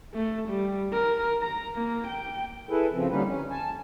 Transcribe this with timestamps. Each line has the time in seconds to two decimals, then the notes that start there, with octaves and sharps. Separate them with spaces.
0.14 A3
0.49 G3
0.93 A#4
1.41 A#5
1.75 A#3
2.08 G5
2.70 E4 G#4 A4 B4
2.93 C#3 F3 C4
3.10 D3 G3 A#3 C#4 D#4 B4
3.26 C#4
3.51 G#5 A5